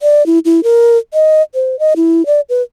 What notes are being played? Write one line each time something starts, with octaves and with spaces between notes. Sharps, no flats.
D5
E4
E4
A#4
D#5
C5
D#5
E4
D5
B4